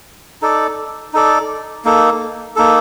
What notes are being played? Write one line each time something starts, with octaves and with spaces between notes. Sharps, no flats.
D#4 A4 D5
D#4 A4 D5
A#3 D#4 A4
A#3 D#4 A4